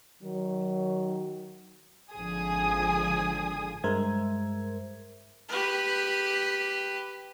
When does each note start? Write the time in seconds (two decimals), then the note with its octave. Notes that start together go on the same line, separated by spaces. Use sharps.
0.22 D#3 F#3
2.13 G#1 D3 F3 G#4 G#5 D#6
3.84 G2 G#3 A#4 C5 E5 G#6
5.49 G4 B4